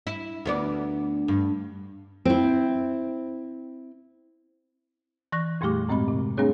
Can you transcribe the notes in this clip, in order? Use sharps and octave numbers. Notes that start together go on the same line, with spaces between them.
E4
D2 B3 D5
G2
C4 E4
E3 C#6 F#6 A#6
F2 A#2 G3 A3 G4 D6
G#2 G#3 C4 D#5 B5
C3
G3 A3 C4 D4 G#4 C#5